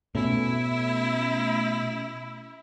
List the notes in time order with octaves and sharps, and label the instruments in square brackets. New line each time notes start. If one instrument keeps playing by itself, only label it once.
[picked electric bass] B2 [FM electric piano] A3 C#4 [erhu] E4